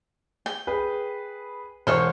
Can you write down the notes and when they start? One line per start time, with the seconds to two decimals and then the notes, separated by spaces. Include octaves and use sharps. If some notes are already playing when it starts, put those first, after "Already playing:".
0.46 G5
0.67 G#4 B4
1.87 E1 C5 C#5 E5 F5